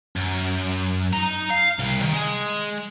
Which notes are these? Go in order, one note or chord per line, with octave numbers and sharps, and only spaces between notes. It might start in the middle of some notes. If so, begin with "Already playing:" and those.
F#2
D#4 A#5
F5
C2
D#3
G#3